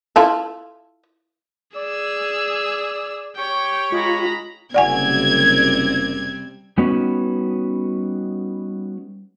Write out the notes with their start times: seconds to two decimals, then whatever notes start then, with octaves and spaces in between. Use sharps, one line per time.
0.16 E4 F4 A4
1.76 G#4 D5 E6
3.37 G4 C#5 G5
3.92 G#3 F4 A#5 B5
4.74 F#1 C3 G3 C4 D5 F#5 G#5 G#6
6.78 G3 B3 C#4 D#4 F#4 B4